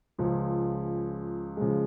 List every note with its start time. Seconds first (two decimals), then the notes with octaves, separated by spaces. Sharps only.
0.18 C#2 C#3 F3
1.57 C#3 F3 G#3